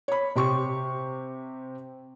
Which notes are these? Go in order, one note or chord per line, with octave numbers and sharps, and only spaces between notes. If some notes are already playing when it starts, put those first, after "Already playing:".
C#5 B5
C3 G4 C6 C#6